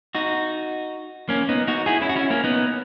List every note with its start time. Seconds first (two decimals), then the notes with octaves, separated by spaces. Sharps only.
0.15 D#4 F#4
1.29 A#3 C#4
1.49 B3 D#4
1.68 D#4 F#4
1.86 E4 G#4
2.02 C#4 E4
2.09 F#4
2.16 C#4 E4
2.30 A#3 C#4
2.44 B3 D#4